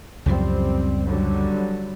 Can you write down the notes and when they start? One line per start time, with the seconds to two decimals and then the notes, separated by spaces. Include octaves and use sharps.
0.26 C#2 F#2 F3 G3 C4
1.07 D3 F#3 G3